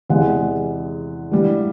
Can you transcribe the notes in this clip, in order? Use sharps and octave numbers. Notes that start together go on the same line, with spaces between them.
E2 C3 E3 G#3 F#5
G2 E3 G3